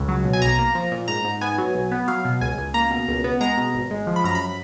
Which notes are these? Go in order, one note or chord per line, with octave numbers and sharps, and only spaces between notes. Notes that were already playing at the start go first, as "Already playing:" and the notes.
Already playing: C#2
F#3
B2
G#5
B1 A#5
A#3
F3
A#2
G#2 A#5
G#2
B3 G#5
F#3
B1
B3
F#3 F5
B2
C#2 G#5
C#2
A#3 A#5
B2
C#2
B3
G#3 A#5
B2
G#1
G#3
F3
B5
F#2 A#5
B5